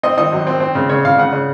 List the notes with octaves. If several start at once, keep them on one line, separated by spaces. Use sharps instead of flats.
C4 D#5
D#3 D#5
F#2
C4
C4
C#3
C#3 C#5
C#3 F5
C#3 F#5
C#3